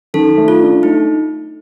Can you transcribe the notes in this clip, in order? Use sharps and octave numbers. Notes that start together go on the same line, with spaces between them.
D#3 A4
A3
F4
D4
A3 D#4